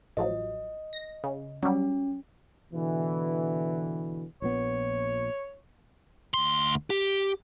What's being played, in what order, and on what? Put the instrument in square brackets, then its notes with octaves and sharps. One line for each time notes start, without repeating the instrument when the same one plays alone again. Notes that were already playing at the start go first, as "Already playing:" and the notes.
[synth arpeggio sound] A1 F3 F#3 [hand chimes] D#5
[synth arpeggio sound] A#6
C#3
[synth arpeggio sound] F#3 G3 [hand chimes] C#4
[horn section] B2 D3 E3
[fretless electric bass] A#1 A#2 B3 [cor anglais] C#5
[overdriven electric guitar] D2 C6
G4